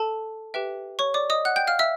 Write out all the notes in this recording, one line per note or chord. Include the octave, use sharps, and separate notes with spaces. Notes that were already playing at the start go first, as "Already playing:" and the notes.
Already playing: A4 A5
G4 B4 E5 G5
C#5 C#6
D5 D6
D#5 D#6
F#5 F#6
G5 G6
F5 F6
E5 E6